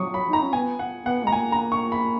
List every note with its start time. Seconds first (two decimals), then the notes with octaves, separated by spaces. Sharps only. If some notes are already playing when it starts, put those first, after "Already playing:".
Already playing: F#3 C#6 D#6
0.14 B5
0.29 D#4 A#5
0.41 C#4
0.53 B3 G#5
0.79 F#5
1.06 B3 F#5
1.25 G#3 A#5
1.32 A#3 G#5
1.52 A#5
1.72 C#6
1.92 B5